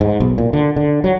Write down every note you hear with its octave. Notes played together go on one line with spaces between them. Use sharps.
G#2
B1
A#2
D3
D3
F#3